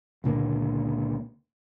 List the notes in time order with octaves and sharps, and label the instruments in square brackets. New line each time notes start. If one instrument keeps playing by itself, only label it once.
[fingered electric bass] C#2 A#2 D3 A#3